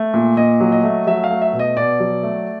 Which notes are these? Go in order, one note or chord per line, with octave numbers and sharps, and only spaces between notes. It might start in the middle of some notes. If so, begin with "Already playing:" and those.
Already playing: A3
A#2
A#2 D#5
F#3
D#5
A3
F#3 E5
F5
A3
E5
B2
D#5
B2 D5
F#3
A3